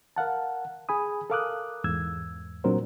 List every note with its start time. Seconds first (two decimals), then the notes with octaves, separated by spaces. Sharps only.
0.16 A#4 F5 F#5 A5
0.89 G#4 G#5 B5 D#6
1.30 A4 A#4 F5 D6 D#6 F#6
1.84 E2 G#2 E6 G#6
2.64 A#2 F#3 C4 D4 A#4 C5